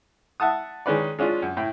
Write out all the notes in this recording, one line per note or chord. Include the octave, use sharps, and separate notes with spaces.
E5 F#5 A5 D#6
D#3 G#3 C#4 B4 D5
G#3 C#4 D4 F4
F#2
A2 G5